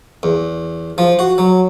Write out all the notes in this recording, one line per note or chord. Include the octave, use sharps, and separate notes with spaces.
E2
F3
F#4
F#3